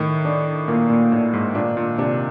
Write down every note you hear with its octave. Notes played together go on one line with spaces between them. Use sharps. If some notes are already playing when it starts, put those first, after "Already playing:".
Already playing: A2 D#3
D4
A#2 A#3
A#2
A2 D4
G#2
A#2 D4
A#2
C3 D4